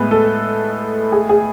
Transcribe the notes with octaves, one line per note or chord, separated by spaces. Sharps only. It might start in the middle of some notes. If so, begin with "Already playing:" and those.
Already playing: A2 G#3 B3 B4
A4
G#4
G#4